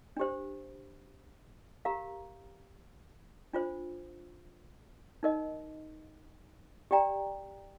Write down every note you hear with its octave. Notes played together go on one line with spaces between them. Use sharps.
D4 G4 C5
G4 A#4 F5 A#5
D4 F4 C5
D#4 A#4 D#5
G4 D5 G5 A#5